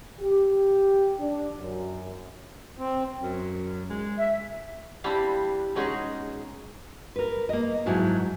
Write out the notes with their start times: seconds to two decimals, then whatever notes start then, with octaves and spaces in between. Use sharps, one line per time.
0.19 G4
1.18 D4
1.58 F#2
2.79 C4
3.22 F#2
3.89 G#3
4.15 E5
5.04 G3 C4 D4 E4 G4 F5
5.75 B2 G#3 C#4 D#4 F#4 G#4
7.16 A#4 B4
7.49 A#3 D#5
7.86 G#2 F3 F#3 E4